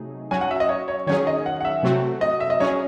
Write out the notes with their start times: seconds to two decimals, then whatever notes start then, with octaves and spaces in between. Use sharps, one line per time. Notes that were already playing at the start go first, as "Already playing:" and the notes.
Already playing: C3 F#3 A3 D#4 G#4
0.31 F#3 C#4 F#4 G#5
0.41 F#5
0.51 E5
0.60 D#5
0.69 C#5
0.88 C#5
1.07 D#3 F#3 C#4 G#4 C#5
1.27 D#5
1.46 F#5
1.61 F#5
1.65 E5
1.83 C3 F#3 A3 C4 F#4
2.21 D#5
2.40 E5
2.50 D#5
2.60 F#3 C#4 G#4 C#5